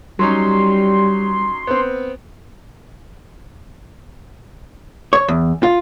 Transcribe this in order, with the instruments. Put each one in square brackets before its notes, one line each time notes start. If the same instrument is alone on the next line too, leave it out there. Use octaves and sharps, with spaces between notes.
[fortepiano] F#3 C#4 D#4 [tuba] G3 [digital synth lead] C6
[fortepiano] B3 C4
[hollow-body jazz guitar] C#5
E2
F4